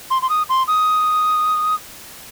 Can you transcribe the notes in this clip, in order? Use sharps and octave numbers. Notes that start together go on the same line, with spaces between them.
C6
C6
D#6
C6
D#6